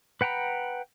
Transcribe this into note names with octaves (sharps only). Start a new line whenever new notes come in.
B4 F#5 G5 A#5 B5